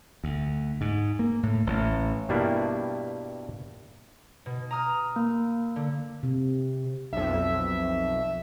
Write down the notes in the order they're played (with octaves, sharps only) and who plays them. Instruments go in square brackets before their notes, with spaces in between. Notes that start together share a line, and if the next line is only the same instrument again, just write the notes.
[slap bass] D2
G#2
A#3
A2
A1
[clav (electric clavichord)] G2 B2 G3 A#3 D4 E4
[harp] B2
A#5 D#6 F6
[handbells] A#3
[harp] D3
[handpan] C3
[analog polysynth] B1 F2 [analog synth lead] E5